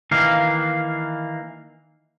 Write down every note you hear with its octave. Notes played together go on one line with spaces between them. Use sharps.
D#3 E3 A#3 F5